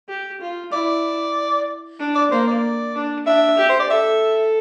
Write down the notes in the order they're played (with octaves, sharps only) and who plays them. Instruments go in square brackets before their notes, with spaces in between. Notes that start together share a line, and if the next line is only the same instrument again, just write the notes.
[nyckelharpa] G4
F4
[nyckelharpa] E4 [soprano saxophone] D5
[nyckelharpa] D4
[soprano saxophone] D5
[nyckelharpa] A#3 [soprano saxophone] C5
[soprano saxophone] D5
[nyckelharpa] D4
[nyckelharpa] D4 [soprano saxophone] E5
[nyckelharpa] G4
[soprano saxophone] C5
D5
[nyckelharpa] A4 [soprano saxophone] E5